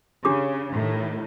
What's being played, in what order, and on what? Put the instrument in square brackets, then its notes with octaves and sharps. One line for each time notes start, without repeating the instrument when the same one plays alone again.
[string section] C#3 [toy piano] D4 G4 D6
[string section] A2 D#3